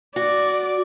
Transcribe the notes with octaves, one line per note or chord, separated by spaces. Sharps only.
F#4 D5